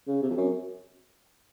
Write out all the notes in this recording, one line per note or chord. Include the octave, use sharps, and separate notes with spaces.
C#3
C3
F2
F#2